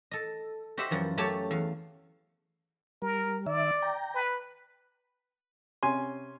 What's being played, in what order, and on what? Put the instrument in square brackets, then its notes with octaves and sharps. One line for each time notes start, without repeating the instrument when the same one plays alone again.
[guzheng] A4 D#5
F#4 G4 C5 D#5 E5 F#5
F#2 E3 F3
F#2 A3 G4 C#5 A5
E2 F5
[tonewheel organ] G3 [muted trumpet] A#4
[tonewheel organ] D#3 E5 [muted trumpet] D5
[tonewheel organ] G5 A#5
[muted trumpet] B4
[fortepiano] C3 C#4 G#5 C6